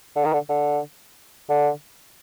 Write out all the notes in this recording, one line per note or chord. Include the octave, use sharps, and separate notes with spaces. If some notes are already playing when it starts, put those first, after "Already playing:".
D3
D#3
D3
D3
D3